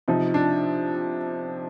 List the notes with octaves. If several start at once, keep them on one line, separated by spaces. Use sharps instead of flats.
C3 F3 D#4
D4